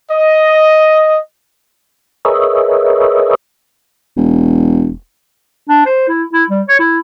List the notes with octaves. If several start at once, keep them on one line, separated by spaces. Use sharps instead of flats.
D#5
G#4 A#4 B4 C#5 D#5 E5
E1
D4
C5
E4
E4
G3
C#5
E4